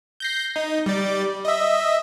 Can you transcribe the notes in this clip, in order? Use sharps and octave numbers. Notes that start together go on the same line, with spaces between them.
G6 A#6 C7
D#4
G3 D5
D#5 E5